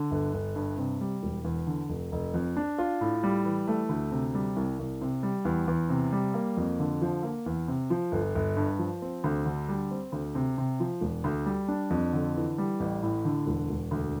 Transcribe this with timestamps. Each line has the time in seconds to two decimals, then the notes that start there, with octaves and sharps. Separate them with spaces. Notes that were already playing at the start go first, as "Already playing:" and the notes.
Already playing: D3
0.11 G1
0.34 G1
0.55 G2
0.77 C3
1.01 G3
1.23 E1
1.44 E2
1.67 D3
1.89 F1
2.12 F1
2.34 F2
2.57 D4
2.78 F4
3.01 A2
3.23 G3
3.45 E3
3.68 A3
3.89 D2
4.11 C3
4.35 G3
4.56 C2
4.79 C2
5.01 C3
5.23 G3
5.45 E2
5.67 E2
5.89 C3
6.12 G3
6.34 A#3
6.57 F2
6.80 D3
7.02 F3
7.23 A#3
7.46 E2
7.68 C3
7.90 F3
8.12 G1
8.35 G1
8.57 G2
8.79 F3
9.02 C4
9.24 D2
9.46 D3
9.69 G3
9.91 C4
10.12 D2
10.35 C3
10.58 C3
10.80 F3
11.01 E1
11.24 D2
11.46 G3
11.68 D4
11.90 F2
12.13 D3
12.36 E3
12.58 G3
12.80 A1
13.03 A2
13.25 D3
13.47 E1
13.69 E1
13.91 D2